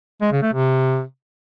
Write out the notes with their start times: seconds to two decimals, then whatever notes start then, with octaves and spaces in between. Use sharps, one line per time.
0.21 G#3
0.32 C#3
0.42 A3
0.53 C3